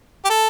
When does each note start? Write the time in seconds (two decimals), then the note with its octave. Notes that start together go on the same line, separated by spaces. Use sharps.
0.25 G4
0.30 A4